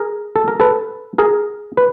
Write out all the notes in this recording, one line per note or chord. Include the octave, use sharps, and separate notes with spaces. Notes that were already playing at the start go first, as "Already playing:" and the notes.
Already playing: G#4 A#4
A4
A#4
A4 B4
G#4 A#4
B4